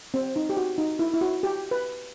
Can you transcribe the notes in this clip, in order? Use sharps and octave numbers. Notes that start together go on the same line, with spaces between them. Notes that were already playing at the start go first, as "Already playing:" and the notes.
C4
D#4
G4
F#4
D#4
E4
E4
F#4
G4
B4